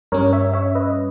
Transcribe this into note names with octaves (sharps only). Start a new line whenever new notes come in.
G2 G3 C#4 A#4 C#5
C#5 E5
C#5 E5
B4 D#5